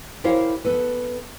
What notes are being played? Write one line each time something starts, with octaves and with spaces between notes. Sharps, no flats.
E4 G4 A#4 C5 C#5 F5
B3 A4 B4